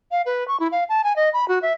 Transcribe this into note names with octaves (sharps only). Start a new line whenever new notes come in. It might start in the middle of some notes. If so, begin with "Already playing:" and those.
F5
B4
C#6
E4
F5
A5
G#5
D#5
B5
F#4
E5